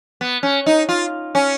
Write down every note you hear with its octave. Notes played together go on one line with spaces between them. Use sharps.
B3
C#4
D#4
F4
C#4